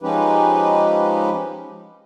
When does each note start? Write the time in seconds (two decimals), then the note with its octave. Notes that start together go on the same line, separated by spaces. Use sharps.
0.02 F3 G#3 C#4 D#4 G4 B4